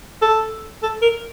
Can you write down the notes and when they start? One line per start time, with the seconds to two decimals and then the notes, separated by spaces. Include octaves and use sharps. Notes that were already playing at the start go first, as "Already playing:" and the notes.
0.22 A4
0.83 A4
1.02 A#4